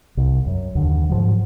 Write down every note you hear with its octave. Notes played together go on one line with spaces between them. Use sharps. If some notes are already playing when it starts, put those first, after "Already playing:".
C2
F#2
D#2 D3
G#2 F3 F#3